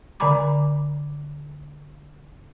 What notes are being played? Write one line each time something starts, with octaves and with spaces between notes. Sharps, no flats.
D3 D5 G#5 A#5 B5 D6